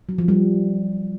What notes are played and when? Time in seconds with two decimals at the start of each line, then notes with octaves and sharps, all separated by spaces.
0.09 F#3
0.18 F3
0.28 G3